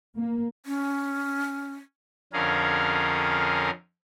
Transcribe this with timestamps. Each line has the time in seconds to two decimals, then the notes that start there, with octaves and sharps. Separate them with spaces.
0.17 A#3
0.66 C#4
2.33 F2 D3 C#4 G#4 A#4 F5